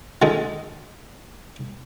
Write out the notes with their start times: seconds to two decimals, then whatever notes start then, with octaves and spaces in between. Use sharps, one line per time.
0.22 D3 D#3 G#3 A4